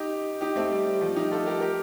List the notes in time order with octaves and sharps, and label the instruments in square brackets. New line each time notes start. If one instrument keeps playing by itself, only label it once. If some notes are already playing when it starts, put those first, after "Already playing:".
Already playing: [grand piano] D#4 G4
D#4 G4
A3 C4
G3
G3
F3 A3
D#4 G4
F4 A4
G4 A#4
G4 A#4